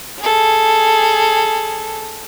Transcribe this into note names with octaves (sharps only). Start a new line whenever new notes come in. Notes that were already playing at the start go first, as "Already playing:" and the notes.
G#4 A4